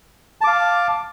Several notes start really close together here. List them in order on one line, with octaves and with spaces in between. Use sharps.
A5 D6 F5